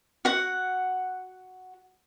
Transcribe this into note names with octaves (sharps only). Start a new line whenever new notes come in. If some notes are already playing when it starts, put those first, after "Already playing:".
F#4 F#5